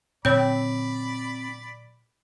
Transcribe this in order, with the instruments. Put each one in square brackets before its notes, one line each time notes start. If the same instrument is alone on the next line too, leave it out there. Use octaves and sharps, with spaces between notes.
[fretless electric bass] A#2 D3 F#3 [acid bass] C4 [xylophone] C#5 G6 [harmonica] D5 B5